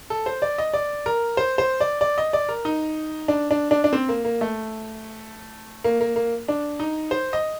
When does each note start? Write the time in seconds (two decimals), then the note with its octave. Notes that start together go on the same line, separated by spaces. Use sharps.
0.10 A4
0.26 C5
0.42 D5
0.58 D#5
0.74 D5
1.06 A#4
1.37 C5
1.58 C5
1.81 D5
2.01 D5
2.18 D#5
2.33 D5
2.49 A#4
2.65 D#4
3.28 D4
3.51 D4
3.71 D4
3.84 D4
3.93 C4
4.09 A#3
4.25 A#3
4.41 A3
5.84 A#3
6.01 A#3
6.16 A#3
6.48 D4
6.80 D#4
7.11 C5
7.33 D#5